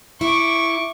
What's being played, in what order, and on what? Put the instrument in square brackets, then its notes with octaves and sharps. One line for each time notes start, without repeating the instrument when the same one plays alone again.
[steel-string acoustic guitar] E4 [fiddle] C#6 D6